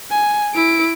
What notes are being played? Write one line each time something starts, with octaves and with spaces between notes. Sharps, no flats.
G#5
E4 D7